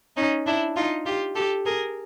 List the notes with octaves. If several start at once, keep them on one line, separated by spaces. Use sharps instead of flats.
C#4 D#4
D4 E4
D#4 F4
F4 G4
G4 A4
G#4 A#4